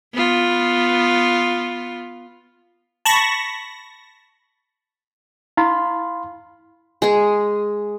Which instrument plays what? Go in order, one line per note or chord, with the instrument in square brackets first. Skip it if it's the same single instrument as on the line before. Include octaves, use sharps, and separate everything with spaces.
[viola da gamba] B3 F4
[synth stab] A5 B5 C#6 A#6
[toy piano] E4 [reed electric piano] F5 B5 C6
[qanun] G#3 G#4